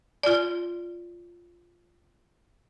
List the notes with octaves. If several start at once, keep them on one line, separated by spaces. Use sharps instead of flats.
F4 D5